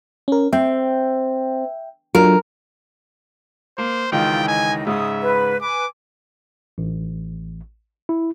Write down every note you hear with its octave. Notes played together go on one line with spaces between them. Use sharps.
C#4 A#4
C4 E5 G5
F#3 D4 F4 A#4
A#3 C5
C#2 D#3 E3 F4 G5
D#5 G#5
G#2 C#3 E5 D#6
B4
B4 G#5 D6
A1
E4